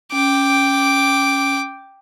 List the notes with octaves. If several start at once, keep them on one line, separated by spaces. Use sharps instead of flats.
C#4 G5 D6